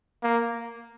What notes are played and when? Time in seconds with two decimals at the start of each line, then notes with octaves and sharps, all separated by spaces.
0.23 A#3